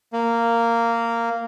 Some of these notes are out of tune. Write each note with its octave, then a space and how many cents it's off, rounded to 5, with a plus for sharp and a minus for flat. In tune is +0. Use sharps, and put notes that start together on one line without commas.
A#3 -10